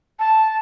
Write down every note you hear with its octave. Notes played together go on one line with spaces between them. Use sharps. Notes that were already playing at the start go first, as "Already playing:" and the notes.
A5